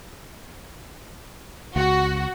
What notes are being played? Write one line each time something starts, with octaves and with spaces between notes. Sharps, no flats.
C#2 F#4